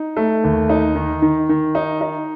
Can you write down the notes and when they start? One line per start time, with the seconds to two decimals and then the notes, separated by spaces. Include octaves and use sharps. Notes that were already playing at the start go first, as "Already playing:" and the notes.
Already playing: D#4
0.16 A3
0.44 D#2
0.69 D#4
0.95 D#3
1.22 D#3
1.49 D#3
1.75 D#4
2.01 D#4